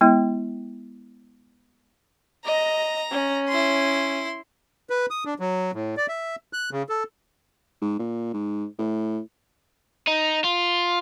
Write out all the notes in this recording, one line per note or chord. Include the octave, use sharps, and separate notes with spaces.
G#3 B3 E4 G5
D#5 A#5
C#4
E4 C6
B4
D#6
D4
F#3
A2
D5
E5
F#6
C#3
A4
G#2
A#2
G#2
A2
D#4
F4